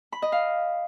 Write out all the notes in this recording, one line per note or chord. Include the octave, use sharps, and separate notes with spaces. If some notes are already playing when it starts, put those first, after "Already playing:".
B5
D#5
F5